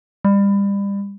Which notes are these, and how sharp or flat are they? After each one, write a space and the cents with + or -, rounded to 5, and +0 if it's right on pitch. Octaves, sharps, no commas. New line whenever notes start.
G3 +30